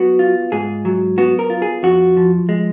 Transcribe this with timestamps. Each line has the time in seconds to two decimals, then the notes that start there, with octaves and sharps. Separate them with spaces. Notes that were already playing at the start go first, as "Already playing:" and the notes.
Already playing: F#3 B3 F#4
0.19 F4
0.52 G#2 G#4
0.85 F#3
1.18 B3 F#4
1.39 A#4
1.50 F4
1.62 G#4
1.83 F2 F#4
2.17 F3
2.49 G#3